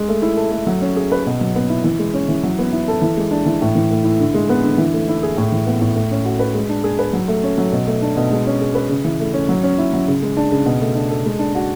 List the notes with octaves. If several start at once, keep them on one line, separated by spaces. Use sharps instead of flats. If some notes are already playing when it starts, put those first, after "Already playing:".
Already playing: G#3
A3
E4
A4
A3
F#3
C#4
G#4
B4
B2
F#3
B3
E4
E3
G#3
C#4
E3
F#3
B3
E4
A4
E3
G#3
D4
E3
A2
E3
A3
E4
D3
G#3
B3
D3
E3
A3
E4
G#4
A2
E3
B3
A2
A3
C#4
F#4
B4
G#3
D4
G#4
B4
F#3
A3
C#4
F#3
B2
A3
D4
B2
G#3
C#4
G#4
B4
C#3
E3
A3
C#4
F#3
C#4
E4
F#3
C#3
G#3
D4
C#3
B2
A3
D4
A4
G#3
D4
F#4